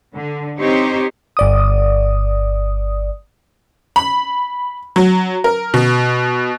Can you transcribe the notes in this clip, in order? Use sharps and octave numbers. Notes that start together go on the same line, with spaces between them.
D3
C4 D#4 G4 C5 C#5
G1 D5 D#6
B5
F#3
A#4
B2